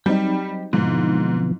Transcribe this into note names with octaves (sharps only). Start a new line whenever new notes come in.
F#3 G3 C4 D#4 G4 G5
G#2 B2 D3 F3 B3 E4